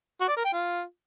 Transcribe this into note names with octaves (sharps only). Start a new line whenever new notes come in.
F#4
D5
A#4
G5
F4